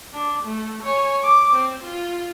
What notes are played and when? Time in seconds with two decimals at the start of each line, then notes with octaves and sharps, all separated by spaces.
0.13 D4
0.44 A3
0.83 C#5 G#5
1.23 D6
1.53 C4
1.83 F4